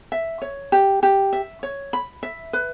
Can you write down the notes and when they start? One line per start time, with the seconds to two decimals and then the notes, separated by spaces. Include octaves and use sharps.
0.12 E5
0.42 C#5
0.72 G4
1.03 G4
1.33 E5
1.63 C#5
1.93 B5
2.23 E5
2.53 B4